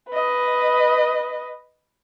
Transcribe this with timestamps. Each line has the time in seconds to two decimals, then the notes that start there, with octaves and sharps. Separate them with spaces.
0.10 B4 D#5